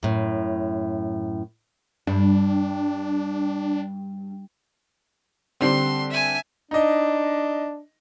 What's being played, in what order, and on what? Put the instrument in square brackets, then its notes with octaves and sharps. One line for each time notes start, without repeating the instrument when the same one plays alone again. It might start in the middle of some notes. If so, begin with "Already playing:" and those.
[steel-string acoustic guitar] F#2 A2
[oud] G2 [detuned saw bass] D4
[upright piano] D3 G3 C4 [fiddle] C6
[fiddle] E5 G#5
[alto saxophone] D4 [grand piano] D#4 D#5